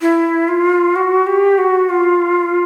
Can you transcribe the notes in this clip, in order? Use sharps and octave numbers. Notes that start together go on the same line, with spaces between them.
E4
F4
F#4
G4
F#4
F4